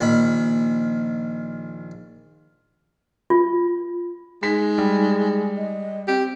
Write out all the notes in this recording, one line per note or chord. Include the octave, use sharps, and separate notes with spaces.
A#1 D#3 B5
F4
G#3 D#4 B6
G3
D#5
C4 G4